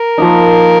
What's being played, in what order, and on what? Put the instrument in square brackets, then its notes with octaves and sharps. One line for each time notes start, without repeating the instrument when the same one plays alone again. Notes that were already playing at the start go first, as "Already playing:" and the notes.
Already playing: [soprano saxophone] A#4
[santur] F3 A#3 D#4